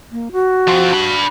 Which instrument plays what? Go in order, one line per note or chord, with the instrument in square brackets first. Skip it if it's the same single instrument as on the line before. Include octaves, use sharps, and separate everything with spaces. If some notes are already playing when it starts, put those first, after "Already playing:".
[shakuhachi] A#3
F#4
[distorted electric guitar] F3 C4
D4 B5